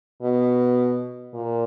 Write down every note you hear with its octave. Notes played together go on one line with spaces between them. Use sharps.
B2
A#2